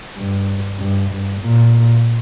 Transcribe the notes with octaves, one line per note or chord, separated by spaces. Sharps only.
G2
G2
G2
A#2